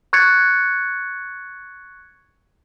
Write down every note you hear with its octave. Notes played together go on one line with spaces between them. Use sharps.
C#6 F#6 G#6 A6 C#7